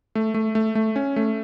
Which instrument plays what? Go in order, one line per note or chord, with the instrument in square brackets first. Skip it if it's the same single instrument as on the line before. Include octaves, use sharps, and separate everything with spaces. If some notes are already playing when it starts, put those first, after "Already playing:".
[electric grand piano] A3
A3
A3
A3
C#4
A3